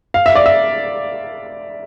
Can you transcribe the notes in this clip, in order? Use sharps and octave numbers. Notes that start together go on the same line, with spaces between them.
F5
E5
D5
E5